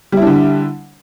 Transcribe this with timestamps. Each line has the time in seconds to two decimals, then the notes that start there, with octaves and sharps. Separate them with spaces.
0.12 G3
0.17 E4
0.22 D4
0.27 D3